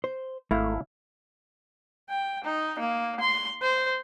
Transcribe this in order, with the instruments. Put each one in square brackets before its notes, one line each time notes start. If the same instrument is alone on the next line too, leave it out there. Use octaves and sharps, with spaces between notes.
[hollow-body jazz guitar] C5
[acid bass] G#1 [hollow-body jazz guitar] A3 [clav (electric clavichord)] E4 F5
[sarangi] G5
D#4
A#3
C6
C5